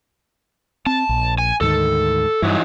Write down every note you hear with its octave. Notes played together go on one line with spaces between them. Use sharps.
C4 A5
A#1
G#5
D2 G#2 D#3 A4
G2 E3 F#3 D#4